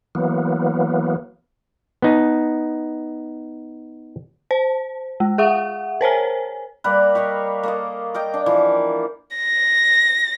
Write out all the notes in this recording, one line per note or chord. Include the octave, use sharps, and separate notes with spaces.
E3 F#3 A#3 B3
B3 D#4
C5
G#3
G#4 E5 F#5
A#4 C5 C#5 G#5
G3 A#3 A#4 B4
G4 C#5 D#5 F5
A#3 A4 D#5
A#4 D#5 G5
D4
E3 F3
A#6